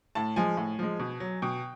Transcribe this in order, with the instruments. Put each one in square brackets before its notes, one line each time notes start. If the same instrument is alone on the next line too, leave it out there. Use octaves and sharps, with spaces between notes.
[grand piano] A2 A5
F3 G#3 G#5
A2
F3 G#3
B2
F#3
B2 G5